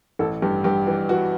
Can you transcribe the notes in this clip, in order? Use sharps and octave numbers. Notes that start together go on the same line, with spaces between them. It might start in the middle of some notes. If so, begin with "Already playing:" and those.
A1 A4
G2 G4
G2 G4
E3
E3 F#4